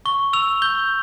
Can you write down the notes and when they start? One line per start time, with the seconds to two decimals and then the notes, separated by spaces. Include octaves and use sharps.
0.06 C#6 G7
0.33 E6 F7
0.62 G6 G7